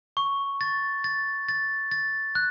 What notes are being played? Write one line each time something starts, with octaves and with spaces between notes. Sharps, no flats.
C#6
A6
A6
A6
A6
F#6